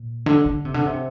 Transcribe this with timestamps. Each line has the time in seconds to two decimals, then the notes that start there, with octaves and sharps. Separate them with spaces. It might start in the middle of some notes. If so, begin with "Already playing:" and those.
Already playing: A#2
0.26 D3
0.46 D3
0.65 C3
0.74 D3
0.85 C3